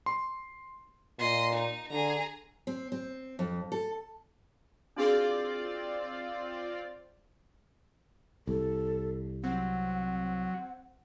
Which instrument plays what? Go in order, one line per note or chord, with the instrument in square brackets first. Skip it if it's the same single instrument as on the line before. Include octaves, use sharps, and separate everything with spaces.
[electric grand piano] C6
[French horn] A#2 [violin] D#5 C6
[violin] D#4
[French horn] D3 [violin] G#4 A#5
[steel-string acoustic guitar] C4
C4
F2
A4
[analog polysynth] C4 F4 D5 [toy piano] D4 F#4 G#4
[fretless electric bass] C2 [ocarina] A4
[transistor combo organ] F#3 [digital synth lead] C4 [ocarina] F#5